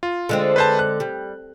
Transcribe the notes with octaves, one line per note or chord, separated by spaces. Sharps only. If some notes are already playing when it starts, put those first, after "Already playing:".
F4
D3 G#3 C4
B4 C5 A5
F#6
G3